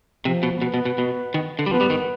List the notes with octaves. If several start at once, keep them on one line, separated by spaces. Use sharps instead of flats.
C3 F3
B2
B2 B3
B2
B2
B2
D#3
D3
G3
F3 B3
G3
D#3